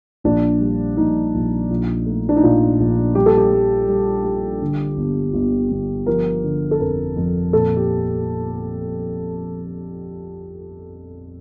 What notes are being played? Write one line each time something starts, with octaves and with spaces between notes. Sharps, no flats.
A#1 D4
G3
A#1 D#4
A#1
A#1
A3
D4
D#4
A#2 F4
A#1
G3 G4
A4
G4
G3
G3
G3
D3
G1
G1
G1
F3 A#4
D3
A4
F2 A#4
F2
A#2 A4
G4